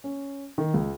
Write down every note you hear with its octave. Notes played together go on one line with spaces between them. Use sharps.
C#4
D#3
C#2